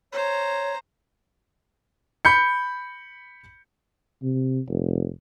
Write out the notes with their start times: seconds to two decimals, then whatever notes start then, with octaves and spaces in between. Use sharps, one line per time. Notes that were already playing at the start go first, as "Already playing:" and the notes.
0.12 C5 C#5 A#5
2.25 B5 G6 C#7
4.23 C3
4.69 F1